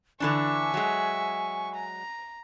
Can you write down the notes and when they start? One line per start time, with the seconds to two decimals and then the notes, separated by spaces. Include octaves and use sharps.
0.20 D3 E3 D4 E5 G#5 C#6
0.74 F#3 G#3
1.75 A#5